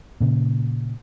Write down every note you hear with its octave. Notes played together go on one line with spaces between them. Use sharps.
A#2 C#3